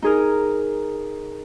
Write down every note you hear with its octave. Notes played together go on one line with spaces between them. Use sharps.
D#4 G#4 A#4